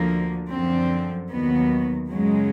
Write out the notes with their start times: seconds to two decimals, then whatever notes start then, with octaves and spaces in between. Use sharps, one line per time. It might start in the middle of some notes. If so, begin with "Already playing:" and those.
Already playing: D2 D3 F3 A#3
0.50 F#2 D3 F3 C4
1.30 D#2 D#3 F#3 B3
2.09 F#2 C#3 F#3 G#3